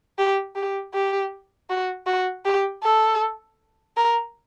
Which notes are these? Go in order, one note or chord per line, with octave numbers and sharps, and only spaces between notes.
G4
G4
G4
F#4
F#4
G4
A4
A#4